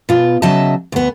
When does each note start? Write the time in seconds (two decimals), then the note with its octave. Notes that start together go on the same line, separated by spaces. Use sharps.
0.09 B2 F4
0.42 C#3 F#3 D#5 E5 A5
0.92 D2 B3